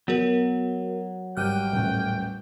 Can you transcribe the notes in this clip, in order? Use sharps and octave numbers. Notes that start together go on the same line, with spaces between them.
F#3 B3 F#4 A#4
G#1 G3 G5 D6 F6 F#6 D#7
D#1 A1 A3